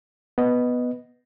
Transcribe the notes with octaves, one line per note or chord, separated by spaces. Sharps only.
B3 D#5